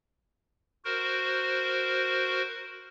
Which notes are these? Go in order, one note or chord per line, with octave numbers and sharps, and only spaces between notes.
F#4 A#4 C5